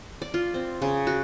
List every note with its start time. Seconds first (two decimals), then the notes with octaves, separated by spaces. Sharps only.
0.22 D5
0.34 F4
0.54 C4
0.82 C#3
1.07 F#4